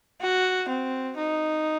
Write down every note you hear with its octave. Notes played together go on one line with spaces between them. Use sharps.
F#4
C4
D#4